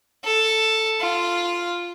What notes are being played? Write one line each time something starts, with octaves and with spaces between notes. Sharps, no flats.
A4
F4